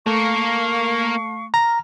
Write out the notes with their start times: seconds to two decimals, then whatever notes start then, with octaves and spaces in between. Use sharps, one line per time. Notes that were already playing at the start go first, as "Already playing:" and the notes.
0.06 A3 A#3 A#4 F5 C#6
1.54 A#5 F6